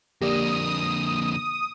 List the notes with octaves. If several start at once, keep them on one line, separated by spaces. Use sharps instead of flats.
F2 D3 A#3 G4 D5 D#6 A#6 E7